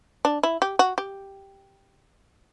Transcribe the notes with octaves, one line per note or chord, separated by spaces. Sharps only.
D4
E4
G4
F#4
G4